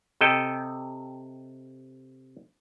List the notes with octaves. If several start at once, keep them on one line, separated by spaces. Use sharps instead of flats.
C3 A4 D#5 G5